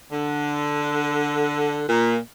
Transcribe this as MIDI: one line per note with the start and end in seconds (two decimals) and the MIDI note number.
0.12 1.84 50
1.89 2.17 46